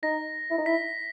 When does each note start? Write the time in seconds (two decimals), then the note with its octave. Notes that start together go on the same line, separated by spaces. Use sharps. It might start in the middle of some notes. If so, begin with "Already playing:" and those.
0.03 D#4 A#6
0.50 E4
0.58 D#4
0.65 E4 B6